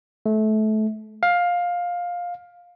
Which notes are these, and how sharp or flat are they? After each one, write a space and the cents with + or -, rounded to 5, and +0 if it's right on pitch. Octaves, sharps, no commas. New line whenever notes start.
A3 -25
F5 +15